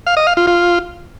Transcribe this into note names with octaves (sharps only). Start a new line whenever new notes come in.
F5
D#5
F5
F4
F4